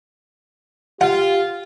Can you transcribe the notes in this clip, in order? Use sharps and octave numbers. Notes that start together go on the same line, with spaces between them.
F4 G4 F#5